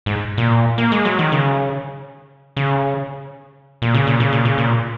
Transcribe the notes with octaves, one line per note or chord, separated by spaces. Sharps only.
G#2
A#2
A#3
G#3
F#3
D#3
C#3
C#3
A#2
C#3
A#2
C#3
A#2
C#3
A#2